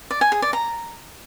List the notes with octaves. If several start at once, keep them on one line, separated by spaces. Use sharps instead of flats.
D5
G#5
G#4
D5
A#5